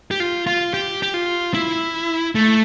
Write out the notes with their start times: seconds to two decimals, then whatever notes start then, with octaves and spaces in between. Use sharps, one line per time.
0.11 G4
0.20 F4
0.47 F4
0.74 G4
1.02 G4
1.14 F4
1.54 E4
2.35 A3